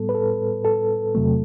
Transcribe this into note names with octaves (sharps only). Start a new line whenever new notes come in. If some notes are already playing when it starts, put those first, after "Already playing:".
Already playing: A2 G3 B3 A4
B4
A4
A4
E2 C3 F#3 A3